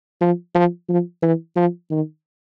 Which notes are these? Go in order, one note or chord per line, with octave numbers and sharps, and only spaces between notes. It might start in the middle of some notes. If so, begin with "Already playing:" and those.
F3
F3
F3
E3
F3
D#3